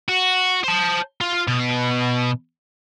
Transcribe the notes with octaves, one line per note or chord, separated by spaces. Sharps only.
F#4
C5 A5
F4
B2